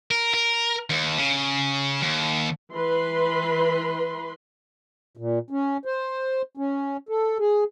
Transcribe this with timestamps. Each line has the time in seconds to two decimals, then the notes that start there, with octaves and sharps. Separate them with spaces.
0.11 A#4
0.34 A#4
0.90 D#2
1.18 C#3
2.01 D#2
2.75 E3 B4 B5 C6
5.17 A#2
5.50 C#4
5.85 C5
6.57 C#4
7.09 A4
7.39 G#4